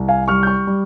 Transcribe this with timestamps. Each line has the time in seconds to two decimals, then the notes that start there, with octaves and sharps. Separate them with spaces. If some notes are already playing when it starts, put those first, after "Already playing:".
Already playing: C2
0.08 F5 G#5
0.28 G3 C#6 F6
0.43 G6
0.47 C#6 F6
0.67 G3